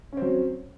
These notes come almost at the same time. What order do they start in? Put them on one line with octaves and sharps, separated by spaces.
C#4 C4 F#3